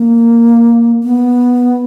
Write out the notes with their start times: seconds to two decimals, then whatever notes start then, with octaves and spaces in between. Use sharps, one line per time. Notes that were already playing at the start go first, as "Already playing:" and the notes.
Already playing: A#3
1.04 B3